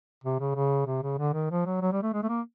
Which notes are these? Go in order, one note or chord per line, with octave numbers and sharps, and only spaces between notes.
C3
C#3
C#3
C3
C#3
D3
D#3
F3
F#3
F#3
G3
A3
G#3
A3
A#3